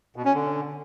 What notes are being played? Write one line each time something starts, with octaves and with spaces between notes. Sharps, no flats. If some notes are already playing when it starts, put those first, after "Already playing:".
B2
C#4
D3